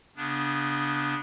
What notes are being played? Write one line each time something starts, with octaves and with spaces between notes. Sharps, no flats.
C#3 B3 D4